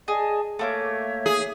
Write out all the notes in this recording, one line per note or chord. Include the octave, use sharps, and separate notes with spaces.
G#4 D5 D#5 A5
A3 A#3 C#5 E5 D6
G#4